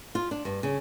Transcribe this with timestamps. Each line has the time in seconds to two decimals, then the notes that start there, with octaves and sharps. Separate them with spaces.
0.15 F4
0.31 D4
0.45 G2
0.63 C#3